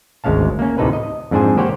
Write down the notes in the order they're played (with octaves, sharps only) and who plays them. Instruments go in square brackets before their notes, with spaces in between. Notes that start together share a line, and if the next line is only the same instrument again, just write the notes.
[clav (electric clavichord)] G#1 D2 G#3 C#4 F5 A5
A#3 C#4
D2 A2 C3 D#4 A4 B4
D#5
F2 G#2 D4 G#4 C5 G#5
A#3 G4 C5 C#5 F#5 G5